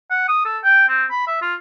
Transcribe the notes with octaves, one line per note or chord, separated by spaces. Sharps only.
F#5
D#6
A4
G5
C4
B5
E5
F4